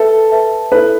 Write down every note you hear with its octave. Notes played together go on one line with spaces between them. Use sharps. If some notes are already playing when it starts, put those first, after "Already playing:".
Already playing: A4 B4 E5 A5
B4 E5 A5
E4 A4 B4 E5